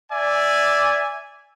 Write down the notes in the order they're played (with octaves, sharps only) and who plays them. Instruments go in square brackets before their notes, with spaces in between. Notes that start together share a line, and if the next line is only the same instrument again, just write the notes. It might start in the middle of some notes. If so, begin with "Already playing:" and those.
[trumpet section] D5 E5 G#5